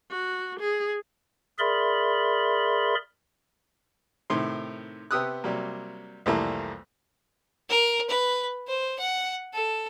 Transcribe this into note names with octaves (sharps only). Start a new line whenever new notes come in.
F#4
G#4
G#4 A#4 D5 E5 B5 C6
A2 C3 D#3 C6
C3 B3 G4 D#6 E6 F#6
C3 F#3 G3 A#3
C2 F2 E3 G3 A3 A#3
A#4
B4
C5
F#5
A4